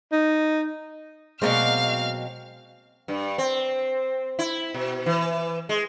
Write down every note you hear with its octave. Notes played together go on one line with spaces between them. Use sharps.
D#4
B2 F#3 G#3 A#3 C4 D5 F5 F6
G2
C4
E4
B2
E3
G#3